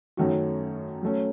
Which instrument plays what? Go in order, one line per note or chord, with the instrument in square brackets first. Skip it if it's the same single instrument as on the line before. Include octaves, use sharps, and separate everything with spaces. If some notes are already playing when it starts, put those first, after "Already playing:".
[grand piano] F#2 D#3 A3 C#4 F#4
F#3 A3 C#4